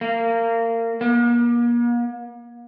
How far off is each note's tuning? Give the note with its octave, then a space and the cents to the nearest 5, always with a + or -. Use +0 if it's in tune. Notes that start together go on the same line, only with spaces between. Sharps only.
A#3 -25
A#3 +40